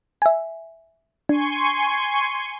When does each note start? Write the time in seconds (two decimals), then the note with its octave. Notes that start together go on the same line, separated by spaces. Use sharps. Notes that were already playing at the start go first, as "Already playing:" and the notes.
0.22 E5 G#5
1.29 D4 G#5 C6 C#6